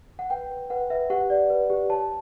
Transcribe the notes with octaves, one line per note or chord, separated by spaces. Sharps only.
F#5
B4 G5
B4
B4 F#5
B4 E5
G4 F#5
D5
B4
G4
C#5 A5